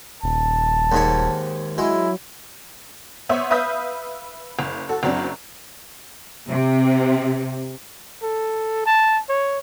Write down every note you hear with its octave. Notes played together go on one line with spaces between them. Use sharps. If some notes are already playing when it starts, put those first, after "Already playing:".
D#1 A5
D#2 G#2 C#5
F#3 G#3 E4
B3 C5 C#5 E5
B4 E5 F5 D#6 G6 B6
F#1
F#4 A4
F#1 F#2 F#3 C4 D4
C3
A4
A5
C#5